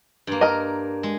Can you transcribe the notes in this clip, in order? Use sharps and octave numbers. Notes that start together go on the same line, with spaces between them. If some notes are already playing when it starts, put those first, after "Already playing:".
G2 A#3
A#4 D#5
G#3